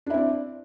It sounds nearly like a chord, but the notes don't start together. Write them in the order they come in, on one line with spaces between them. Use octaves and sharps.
D4 E4 C4 D5